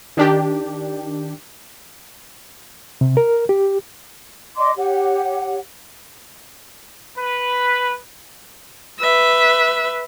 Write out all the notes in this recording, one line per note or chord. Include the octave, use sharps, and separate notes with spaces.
D#3 D4 G4
C3
A#4
G4
D5 D#5 C6 D6
G4 C#5 F#5
B4
B4 E5